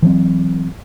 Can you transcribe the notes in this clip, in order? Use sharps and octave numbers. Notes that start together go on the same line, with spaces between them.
E3 F#3 C4